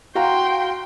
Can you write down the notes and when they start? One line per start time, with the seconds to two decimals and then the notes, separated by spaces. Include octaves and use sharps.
0.15 F#4 F5 G5 A#5 C6